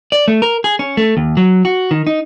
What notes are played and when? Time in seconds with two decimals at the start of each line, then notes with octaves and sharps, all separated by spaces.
0.12 D5
0.28 A3
0.42 A#4
0.64 G#4
0.79 C#4
0.97 A3
1.17 D#2
1.37 F#3
1.65 F#4
1.91 D#3
2.07 D#4